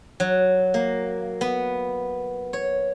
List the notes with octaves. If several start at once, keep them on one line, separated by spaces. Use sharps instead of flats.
F#3
A#3
B3
C#5